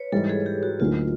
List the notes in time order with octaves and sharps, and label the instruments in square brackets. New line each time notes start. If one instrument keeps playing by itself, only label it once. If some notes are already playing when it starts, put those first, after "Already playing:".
Already playing: [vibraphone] B4 C#5
[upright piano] G#2 E3 G3 [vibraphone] A4
[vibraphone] G#4
G4
F#4
[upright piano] D2 D3 F#3 A#3 D#4 [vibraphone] F4